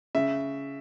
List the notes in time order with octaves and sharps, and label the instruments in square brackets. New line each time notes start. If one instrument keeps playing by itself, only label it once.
[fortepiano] C#3 E5